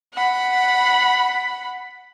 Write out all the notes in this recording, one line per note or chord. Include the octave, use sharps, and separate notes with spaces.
F#5 B5